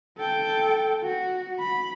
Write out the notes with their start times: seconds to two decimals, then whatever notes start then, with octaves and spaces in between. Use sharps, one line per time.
0.17 A4 G5
1.04 F#4
1.59 B5